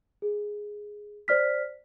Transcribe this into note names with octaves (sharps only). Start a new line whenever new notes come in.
G#4
C5 D5 F6 B6